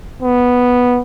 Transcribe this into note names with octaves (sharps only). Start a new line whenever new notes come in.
B3